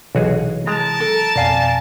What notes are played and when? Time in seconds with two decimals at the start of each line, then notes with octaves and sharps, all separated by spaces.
0.15 B1 C3 E3 F#3 F#4 G#4
0.67 G#3 A#4 A5
1.00 A4
1.36 F2 B2 D5 F5 G#5